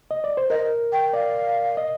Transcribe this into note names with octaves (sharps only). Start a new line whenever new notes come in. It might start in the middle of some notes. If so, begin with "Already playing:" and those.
D#5
D5
C5
A#4 D#5
G5
D5 F5
D#5